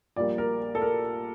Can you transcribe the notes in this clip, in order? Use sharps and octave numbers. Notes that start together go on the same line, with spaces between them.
A#1 A#2 G3 A#3 D5
A#4
A4
A#4